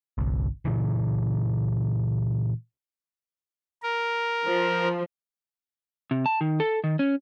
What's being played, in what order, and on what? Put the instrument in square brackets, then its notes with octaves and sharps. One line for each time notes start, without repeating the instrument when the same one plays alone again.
[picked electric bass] G1 C2
A#2 C#3 E3
[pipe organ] A#4
[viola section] F3
[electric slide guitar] C3
A5
D#3
A4
D#3
C#4